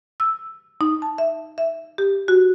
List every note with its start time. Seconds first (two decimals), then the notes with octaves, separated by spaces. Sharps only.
0.20 E6
0.81 D#4
1.02 A5
1.18 E5
1.58 E5
1.98 G4
2.28 F#4